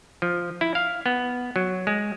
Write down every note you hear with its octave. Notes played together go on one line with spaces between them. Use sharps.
F3
E4
F5
B3
F#3
G#3